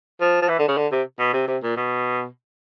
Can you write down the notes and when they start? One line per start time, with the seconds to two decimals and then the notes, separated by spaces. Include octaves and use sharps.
0.21 F3
0.42 F3
0.49 E3
0.59 D3
0.68 C#3
0.77 D3
0.92 C3
1.19 B2
1.33 C3
1.48 C3
1.63 A#2
1.77 B2